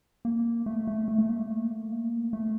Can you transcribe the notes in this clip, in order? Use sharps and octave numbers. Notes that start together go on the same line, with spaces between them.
A#3
A3
A3
A3
A3
A#3
A3
A#3
A3
A#3
A3